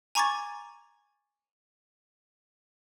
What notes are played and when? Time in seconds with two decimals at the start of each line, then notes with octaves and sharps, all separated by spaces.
0.15 G#5 A#5 C#6 D6 G#6 A6